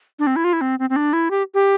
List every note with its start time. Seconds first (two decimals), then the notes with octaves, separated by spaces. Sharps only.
0.19 D4
0.27 C4
0.36 E4
0.44 F4
0.53 E4
0.61 C4
0.79 C4
0.90 C4
0.96 D4
1.13 E4
1.31 G4
1.54 G4